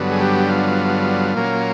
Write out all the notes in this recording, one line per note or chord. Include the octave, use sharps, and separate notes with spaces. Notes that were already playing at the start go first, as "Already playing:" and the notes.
Already playing: G2 D3 F#3 B3
G#4
G4
F4
A#2 F#3 A#3 C#4